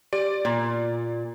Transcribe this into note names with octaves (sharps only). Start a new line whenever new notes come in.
G4 D5
A#2